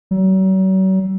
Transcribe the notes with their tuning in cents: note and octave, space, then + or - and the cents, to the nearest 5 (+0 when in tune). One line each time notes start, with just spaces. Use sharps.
F#3 +40